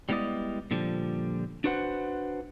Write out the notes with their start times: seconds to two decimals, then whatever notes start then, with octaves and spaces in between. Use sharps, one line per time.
0.09 G3 G#3 B3 E4 D5 D#5
0.71 A#2 D3 F3 G3
1.64 D4 F#4 B4 C5 F#5